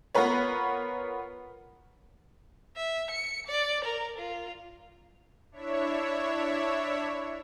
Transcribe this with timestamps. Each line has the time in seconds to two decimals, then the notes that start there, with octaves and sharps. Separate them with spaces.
0.15 B3 F4 A#4 B4 C#5
2.76 E5
3.11 C#7
3.47 D5
3.85 A#4
4.18 F4
5.52 D4 E4 C#5 E5